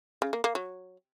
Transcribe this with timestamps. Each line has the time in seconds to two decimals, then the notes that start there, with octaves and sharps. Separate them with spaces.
0.22 C#3
0.33 A#3
0.44 A#3
0.55 F#3